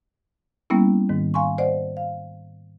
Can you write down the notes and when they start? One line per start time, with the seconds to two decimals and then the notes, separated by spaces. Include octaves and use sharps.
0.70 G3 A#3 B3 C#4 E4
1.09 G#2 D#3
1.34 F5 G#5 C6 C#6
1.58 C5 D5 D#5 F#5
1.97 F5